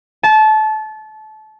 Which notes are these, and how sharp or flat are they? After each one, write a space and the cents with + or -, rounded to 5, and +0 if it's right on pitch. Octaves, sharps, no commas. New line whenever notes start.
A5 -25